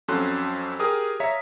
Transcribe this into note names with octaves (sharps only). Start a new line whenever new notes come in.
F2 F#3 C#4 A4 C6 F#6
G4 G#4 A#4 D#6 F6
C#5 E5 F5 A#5 B6